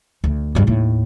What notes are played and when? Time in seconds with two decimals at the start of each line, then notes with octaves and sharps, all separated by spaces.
0.24 D2
0.55 G2 F#3
0.67 D#2 A2